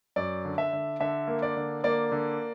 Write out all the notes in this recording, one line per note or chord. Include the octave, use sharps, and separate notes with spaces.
F#2 D5
D3
E5
D3
D3 E5
A#3
D5
D3
A#3 D5
D3